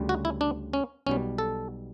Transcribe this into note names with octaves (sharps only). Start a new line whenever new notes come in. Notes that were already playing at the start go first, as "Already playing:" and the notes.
Already playing: D2 C#3 G3
F#4
E4
D4
C#4
B1 B2 G3 C#4
A4